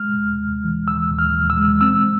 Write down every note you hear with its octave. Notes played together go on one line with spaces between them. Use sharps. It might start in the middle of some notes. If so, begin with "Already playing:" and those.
Already playing: G#3 F6
D#2
D#2
E3
D#2 E6
D#2
F6
D#2
E6
G#3
C4 E6